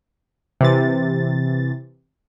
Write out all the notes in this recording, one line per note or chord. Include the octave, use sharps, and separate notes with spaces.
C3 E3 A6